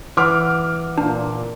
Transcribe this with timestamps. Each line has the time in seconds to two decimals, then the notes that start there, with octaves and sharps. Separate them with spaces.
0.17 E3 F#5 D6 F6
0.98 A#2 D4